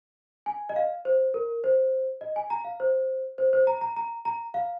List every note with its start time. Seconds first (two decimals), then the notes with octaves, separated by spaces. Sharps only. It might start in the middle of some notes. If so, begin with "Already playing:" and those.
0.46 G#5
0.69 D#5
0.76 F5
1.05 C5
1.34 A#4
1.64 C5
2.21 D#5
2.36 G#5
2.50 A#5
2.65 F5
2.80 C5
3.38 C5
3.53 C5
3.67 A#5
3.81 A#5
3.96 A#5
4.25 A#5
4.54 F5